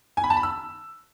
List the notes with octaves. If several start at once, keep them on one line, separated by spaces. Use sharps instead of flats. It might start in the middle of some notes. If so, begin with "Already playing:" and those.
G#5
B5
A5
B5
E6